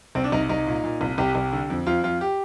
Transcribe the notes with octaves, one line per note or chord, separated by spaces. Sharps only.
C2 C4
D4
C2 D#4
C2 D#4
A#2
A#2
C2
C2 G4
C2
D3
F2
F2 F4
F2 F4
G4